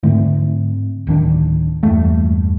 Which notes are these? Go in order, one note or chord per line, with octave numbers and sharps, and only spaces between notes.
G#2 D3 A3 C4
D1 D#3 D4
E2 G2 A3 A#3